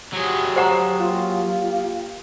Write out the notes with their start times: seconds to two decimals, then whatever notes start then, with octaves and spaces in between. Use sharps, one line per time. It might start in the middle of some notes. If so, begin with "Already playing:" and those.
0.13 D2 F3 F#3 G4 G#4
0.56 C5 F#5 A#5
0.99 A#3 F4 G4